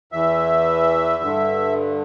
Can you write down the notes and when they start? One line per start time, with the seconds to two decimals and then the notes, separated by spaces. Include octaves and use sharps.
0.12 E2 E3 E5
1.23 G2 D3